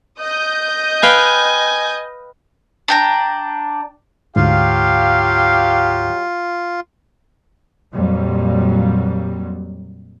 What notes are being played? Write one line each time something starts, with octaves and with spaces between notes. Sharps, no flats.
D#5 D#6 G6
B4 F5 G5 G#5
D4 G5 A#5
D2 G#2 F#3 F4 G4 F5
F2 A#2 F#3 G3